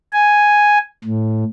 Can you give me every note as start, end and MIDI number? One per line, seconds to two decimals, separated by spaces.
0.13 0.78 80
1.04 1.44 45